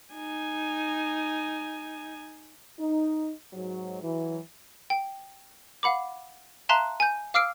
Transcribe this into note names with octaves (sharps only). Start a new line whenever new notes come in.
D#4 G#5
D#4
G#2 F#3
E3 F#3
G5
F5 F#5 B5 D6
E5 F5 A5 A#5 C6 F#6
G#5 G6
F5 D6 E6 F6 C7 D7